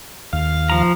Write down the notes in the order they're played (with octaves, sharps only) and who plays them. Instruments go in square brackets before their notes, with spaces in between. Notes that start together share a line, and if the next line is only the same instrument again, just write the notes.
[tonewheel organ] D#2 F5
[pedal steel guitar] F3 A#5